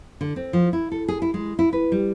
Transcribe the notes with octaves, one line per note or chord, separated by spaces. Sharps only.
D3
C4
F3
E4
A4
G#4
E4
G#3
E4
B4
G3